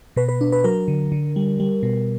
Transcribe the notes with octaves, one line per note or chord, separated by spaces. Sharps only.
B2 B4
B4
D4
B4
F#3 A#4
D3
D3
G3
G3
B2